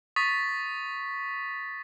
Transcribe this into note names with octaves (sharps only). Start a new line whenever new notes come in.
C#6 D#6 A6 B6